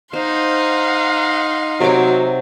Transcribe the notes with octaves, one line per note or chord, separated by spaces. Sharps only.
D#4 C5 F5 F#5 C6
C3 F#3 D6